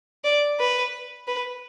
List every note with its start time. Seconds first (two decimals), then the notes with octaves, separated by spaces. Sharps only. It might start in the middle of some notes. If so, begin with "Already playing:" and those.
0.24 D5
0.60 B4
1.27 B4